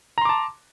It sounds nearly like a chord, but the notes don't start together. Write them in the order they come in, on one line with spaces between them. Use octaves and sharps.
A#5 C6 D6 A5